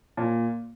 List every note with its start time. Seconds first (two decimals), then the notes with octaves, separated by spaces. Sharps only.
0.17 A#2